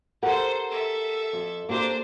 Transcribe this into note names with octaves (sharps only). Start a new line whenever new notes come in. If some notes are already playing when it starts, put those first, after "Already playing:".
G4 A4 A#4 C5 F#5
A4 E5
F2
A#3 C4 D4 G4 C5